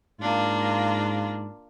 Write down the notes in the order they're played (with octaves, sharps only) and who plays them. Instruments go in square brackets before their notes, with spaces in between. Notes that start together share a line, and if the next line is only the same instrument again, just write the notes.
[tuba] G#2 [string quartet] A#3 D4 F4